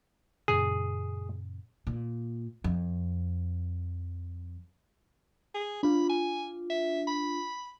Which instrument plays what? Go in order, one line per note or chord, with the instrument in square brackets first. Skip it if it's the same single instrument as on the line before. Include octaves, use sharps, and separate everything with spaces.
[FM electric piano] F#2 A#2 C#3 [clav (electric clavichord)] G#4
[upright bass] A#2
F2
[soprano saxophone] G#4
[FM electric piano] D4 F4 [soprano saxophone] B5
[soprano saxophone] G#5
E5
B5